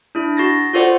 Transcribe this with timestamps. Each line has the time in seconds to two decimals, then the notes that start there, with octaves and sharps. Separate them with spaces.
0.15 D4 E4
0.37 F#4 A6 A#6
0.73 F4 F#4 A4 C5 D5 F#5